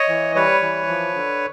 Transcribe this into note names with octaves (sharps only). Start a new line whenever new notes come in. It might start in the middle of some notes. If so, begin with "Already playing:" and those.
Already playing: C#5 D#5
E3
G3 B4 C#5
E3
F3
D3